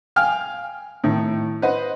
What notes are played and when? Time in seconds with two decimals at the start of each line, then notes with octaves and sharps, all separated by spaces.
0.16 F5 G5 G#5 F6
1.04 A2 D#3
1.62 B4 C5 D#5 F#5